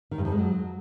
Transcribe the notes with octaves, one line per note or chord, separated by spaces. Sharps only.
D#3
G2
F2
G#3
F#3